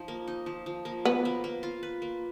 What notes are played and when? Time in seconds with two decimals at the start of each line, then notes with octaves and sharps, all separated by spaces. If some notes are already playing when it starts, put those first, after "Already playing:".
Already playing: F3 D#4
0.08 A#3
0.28 D#4
0.46 F3
0.66 F3
0.85 A#3
1.05 B3 B4
1.25 A#3
1.44 A#3
1.63 F4
1.83 B4
2.02 A#3